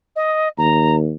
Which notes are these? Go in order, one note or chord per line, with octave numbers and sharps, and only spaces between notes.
D#5
D#2 A#5